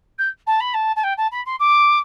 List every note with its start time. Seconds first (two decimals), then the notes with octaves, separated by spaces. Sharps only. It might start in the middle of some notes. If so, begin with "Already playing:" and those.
0.18 G6
0.47 A5
0.60 B5
0.74 A5
0.96 A5
1.03 G5
1.17 A5
1.31 B5
1.46 C6
1.59 D6